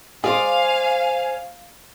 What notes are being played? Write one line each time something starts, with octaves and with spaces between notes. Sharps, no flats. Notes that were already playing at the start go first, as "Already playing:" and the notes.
G#3 G#4 C5 D5 F5 G#5